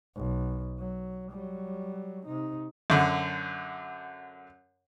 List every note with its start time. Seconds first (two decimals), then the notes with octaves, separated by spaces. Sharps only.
0.16 B1
0.79 F#3
1.31 F#3 G3
2.25 C3 D#4
2.90 F#2 D3